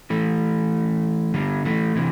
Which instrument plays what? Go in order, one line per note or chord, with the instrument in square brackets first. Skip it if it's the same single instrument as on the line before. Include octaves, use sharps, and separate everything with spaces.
[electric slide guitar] E3 A3
D3 G3
E3 A3
C3 E3